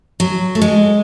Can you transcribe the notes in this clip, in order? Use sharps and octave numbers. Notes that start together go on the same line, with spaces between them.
F#3
A3
G#3